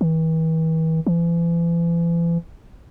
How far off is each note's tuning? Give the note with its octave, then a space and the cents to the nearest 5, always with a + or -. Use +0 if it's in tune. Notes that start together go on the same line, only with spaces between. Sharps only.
E3 -40
E3 +40